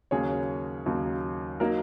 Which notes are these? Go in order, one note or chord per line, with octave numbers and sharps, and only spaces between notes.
D#2 C#3 F#3 A#3 G#4 C#5
D#2 C#3 F#3 A#3
F#3 A#3 D#4 A#4